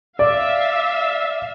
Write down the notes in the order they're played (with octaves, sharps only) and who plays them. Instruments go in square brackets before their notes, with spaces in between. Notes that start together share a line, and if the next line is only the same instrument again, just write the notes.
[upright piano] D5 [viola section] E5 F5